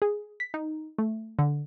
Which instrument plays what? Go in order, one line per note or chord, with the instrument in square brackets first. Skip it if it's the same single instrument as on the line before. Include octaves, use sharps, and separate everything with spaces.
[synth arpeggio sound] G#4
B6
D#4
A3
D3